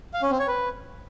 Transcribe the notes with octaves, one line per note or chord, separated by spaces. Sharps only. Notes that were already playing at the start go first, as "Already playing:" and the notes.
F5
C#4
C4
C#5
B4